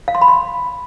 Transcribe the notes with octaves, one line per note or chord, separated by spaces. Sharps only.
F5
C6
B5
C6